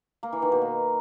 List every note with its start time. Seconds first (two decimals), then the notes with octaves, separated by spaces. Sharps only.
0.23 A#3
0.32 E3
0.42 D#3
0.52 B2
0.62 A#3